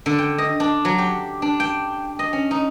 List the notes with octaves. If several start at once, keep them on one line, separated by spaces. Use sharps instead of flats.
D3
G5
D#5
D4
F#3
G4
D4
G5
D#5
C#4
D#4